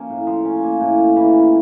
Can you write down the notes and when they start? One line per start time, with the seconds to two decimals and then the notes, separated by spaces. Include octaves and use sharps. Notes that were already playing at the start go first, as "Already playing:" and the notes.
Already playing: F3 A#3 C#4
0.09 A2
0.27 F3
0.45 C#4
0.63 A#3
0.81 A2
0.98 A#3
1.16 E3
1.34 C#4